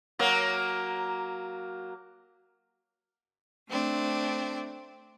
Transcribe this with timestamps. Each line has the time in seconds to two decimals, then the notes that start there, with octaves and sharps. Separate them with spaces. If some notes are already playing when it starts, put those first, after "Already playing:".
0.19 F#3 A#3
3.68 A3 C4 D4